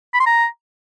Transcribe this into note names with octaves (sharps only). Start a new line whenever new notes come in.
B5
C6
A#5